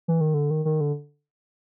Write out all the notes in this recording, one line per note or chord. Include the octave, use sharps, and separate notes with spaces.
E3
D#3
D3
D#3
D#3
D3